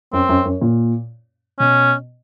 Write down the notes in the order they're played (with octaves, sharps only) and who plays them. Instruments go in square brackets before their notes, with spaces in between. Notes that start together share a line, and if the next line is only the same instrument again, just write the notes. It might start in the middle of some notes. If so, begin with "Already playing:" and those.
[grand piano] F#2 [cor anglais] C4
[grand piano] F#2
F#2
A#2
[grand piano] B2 [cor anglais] C#4